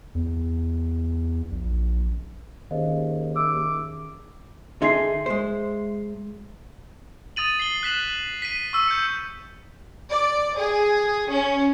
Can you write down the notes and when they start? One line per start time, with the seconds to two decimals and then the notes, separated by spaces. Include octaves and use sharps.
0.15 E2
1.51 A#1
2.71 D#2 D#3 C#4 G#4 C5 D#5 F5
3.36 E5 D6 E6
4.82 D3 D#4 G#4 E5 C6 C7
5.26 G#3 C5
7.36 D#6 A6 D#7 F#7
7.59 C7 G7
7.83 F#6 B6 E7 F#7
8.42 B6 D#7
8.73 C#6 E6
8.88 G6 C#7
10.08 D5
10.55 G#4
11.28 C#4